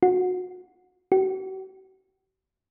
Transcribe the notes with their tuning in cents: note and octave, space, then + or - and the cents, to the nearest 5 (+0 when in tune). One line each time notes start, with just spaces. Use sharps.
F#4 -25
F#4 +45